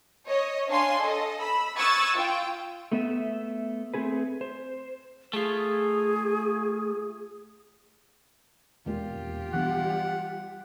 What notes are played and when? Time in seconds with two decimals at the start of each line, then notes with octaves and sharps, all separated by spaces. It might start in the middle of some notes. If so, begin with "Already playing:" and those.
0.27 C#5 D#5
0.69 D4 C#5 F5 G#5 C6
1.00 A4 D#5
1.39 B5 E6
1.78 C#6 D#6 E6 F#6 G#6 A6
2.14 F4 G5
2.92 A3 B3 E5
3.94 A3 C4 G#4 B4
4.41 C5
5.33 A3 F4 G#4
8.86 E1 D#2 A#2 G#3 F4 G4
9.15 E2
9.53 B1 G2 E3 B3 F#5
9.85 G3